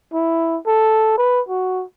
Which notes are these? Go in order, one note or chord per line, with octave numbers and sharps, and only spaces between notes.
E4
A4
B4
F#4